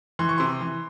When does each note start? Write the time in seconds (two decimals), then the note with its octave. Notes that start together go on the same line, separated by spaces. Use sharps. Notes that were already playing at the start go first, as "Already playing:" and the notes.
0.19 E3 C6
0.29 C#6
0.38 C3 C6
0.61 E3